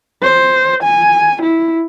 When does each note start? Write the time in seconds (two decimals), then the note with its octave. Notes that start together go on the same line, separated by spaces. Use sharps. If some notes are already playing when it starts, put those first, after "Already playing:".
0.23 C5
0.83 G#5
1.42 E4